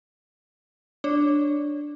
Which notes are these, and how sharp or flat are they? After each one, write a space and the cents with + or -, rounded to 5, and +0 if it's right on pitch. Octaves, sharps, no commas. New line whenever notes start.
D4 +0 C#5 +0